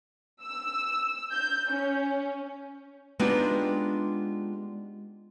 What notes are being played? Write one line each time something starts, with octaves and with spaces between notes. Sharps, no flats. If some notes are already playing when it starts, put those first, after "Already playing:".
E6
G6
C#4
G#3 B3 D4 D#4 F4 G4